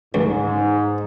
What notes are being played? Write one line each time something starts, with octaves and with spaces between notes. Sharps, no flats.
C#2 G#2